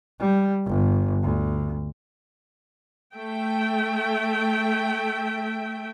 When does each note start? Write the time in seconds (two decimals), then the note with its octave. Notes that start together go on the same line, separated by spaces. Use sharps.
0.19 G3
0.67 G1
1.23 D2
3.15 A3 E5 G5